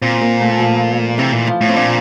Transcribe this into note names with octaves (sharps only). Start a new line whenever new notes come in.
A#2 C4 C5
A#3 A#4
A3 A4
F3 F4
C3 E3 E4
A#2
F3 F4
A2
C4
A#2 D4